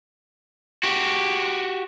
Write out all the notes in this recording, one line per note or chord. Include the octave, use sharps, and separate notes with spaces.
F#4 G4